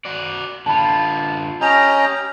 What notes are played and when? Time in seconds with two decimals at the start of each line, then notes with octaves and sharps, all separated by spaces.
0.05 F#4 D5
0.66 D3 F4 A5 B5
1.61 C#4 G4 D#5 A#5